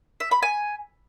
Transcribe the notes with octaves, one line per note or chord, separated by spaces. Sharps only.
E5
B5
G#5